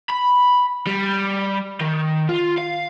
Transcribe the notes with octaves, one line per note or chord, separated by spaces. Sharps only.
B5
G3
D#3
F4
F5